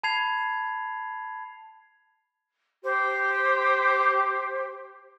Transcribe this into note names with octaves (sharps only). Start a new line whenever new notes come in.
A5 B5 G#6 C7 F7
G4 C5